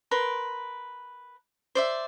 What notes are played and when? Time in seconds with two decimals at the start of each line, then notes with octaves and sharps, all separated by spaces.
0.11 A#4 B4 C6
1.75 C5 D5 E5